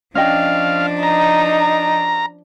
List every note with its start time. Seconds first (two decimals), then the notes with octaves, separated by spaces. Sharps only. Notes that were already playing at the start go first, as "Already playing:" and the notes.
0.15 F3 C#4 D4 D#5 F5 G5
1.03 D#4 A#5